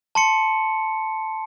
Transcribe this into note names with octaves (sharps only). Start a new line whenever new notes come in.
A5 C6 C#7